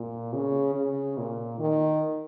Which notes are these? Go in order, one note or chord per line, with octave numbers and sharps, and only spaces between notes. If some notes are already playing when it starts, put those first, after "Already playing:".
Already playing: A#2
C#3
C#3
A#2
D#3